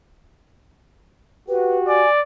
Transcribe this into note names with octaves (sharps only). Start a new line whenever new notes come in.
F#4 G4 B4
D5 G#5